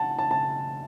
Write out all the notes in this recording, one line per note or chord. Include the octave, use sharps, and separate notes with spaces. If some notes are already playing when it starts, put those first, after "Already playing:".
Already playing: F#5 A5
A5
A5